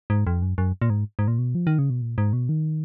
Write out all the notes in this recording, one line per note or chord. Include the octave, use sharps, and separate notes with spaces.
G#2
F2
F#2
F#2
A#2
G#2
G#2
A#2
B2
F3
D#3
C#3
B2
A#2
G#2
B2
D#3